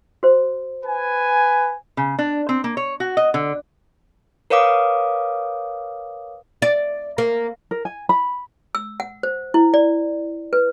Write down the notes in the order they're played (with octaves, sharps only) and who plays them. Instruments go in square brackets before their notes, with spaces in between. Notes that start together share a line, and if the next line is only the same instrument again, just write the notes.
[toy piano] F#4 C5
[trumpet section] B4 G#5
[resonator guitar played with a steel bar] C#3
D4
C4
A#3
C#5
F#4
D#5
D3
[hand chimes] A#4 B4 C#5 F5 D6 D#6
[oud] D5
A#3
[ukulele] A#4
G#5
B5
[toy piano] E6
F#5
C5
E4
D5
B4